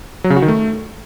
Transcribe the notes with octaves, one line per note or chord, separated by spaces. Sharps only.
F#3
C#3
F#4
D#3
A3